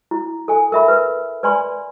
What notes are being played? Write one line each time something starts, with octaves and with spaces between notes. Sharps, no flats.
E4
A4 G#5
A#4 E5 B5
B4
B4 D5 G#5 B5 C6